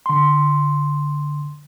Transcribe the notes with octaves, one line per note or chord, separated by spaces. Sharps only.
D3 C6